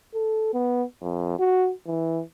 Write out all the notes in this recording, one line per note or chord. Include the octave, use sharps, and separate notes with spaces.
A4
B3
F2
F#4
E3